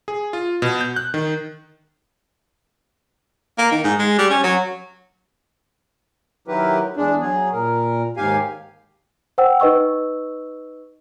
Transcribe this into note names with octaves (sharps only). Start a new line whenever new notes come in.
G#4
F4
B2
G6
F#6
D#3
A#3
D#3
G#2
G#3
G3
C#4
F#3
D#3 F#3 E4 G4 A#4 B4
E2 G#3 D4
F#3 G#4
A#2 A#4
D#2 G#2 G4 F5 G#5
C5 F#5 G5 E6
D#4 B4 D#5 C#6 E6